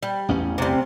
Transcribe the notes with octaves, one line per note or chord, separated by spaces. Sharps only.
G3
A1 E2 C#4
C3 G3